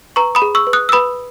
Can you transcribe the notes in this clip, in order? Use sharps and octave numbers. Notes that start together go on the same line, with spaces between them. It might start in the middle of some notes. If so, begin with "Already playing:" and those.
B4 A#5 C#6
B5 D#6
G#4
C#6 E6
B4
D#6 F#6
E6
B4 B5 D#6